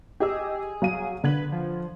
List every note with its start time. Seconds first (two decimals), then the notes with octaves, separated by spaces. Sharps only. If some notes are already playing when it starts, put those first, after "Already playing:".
0.20 G4 G#4 D#5 E6
0.82 F#3 F5 D#7
1.24 D3 B4 G#6 F#7
1.52 F3